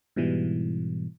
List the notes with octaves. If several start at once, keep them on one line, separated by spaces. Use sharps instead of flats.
G#2 B2 E3 G3